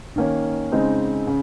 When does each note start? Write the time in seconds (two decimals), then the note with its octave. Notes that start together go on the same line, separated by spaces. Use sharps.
0.16 D#3 A#3 C#4
0.71 C#3 G#3 C4 D#4
1.27 C#3